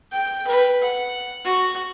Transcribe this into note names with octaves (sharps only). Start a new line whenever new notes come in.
G5
B4
F#5
F#4